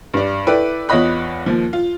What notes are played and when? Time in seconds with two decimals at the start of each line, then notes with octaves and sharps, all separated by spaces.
0.14 G2 D4
0.47 E4 A4 B4 D5 G5
0.89 E2 F4 C#5 D#5 B5 F#6
1.46 D#2 F3
1.73 F4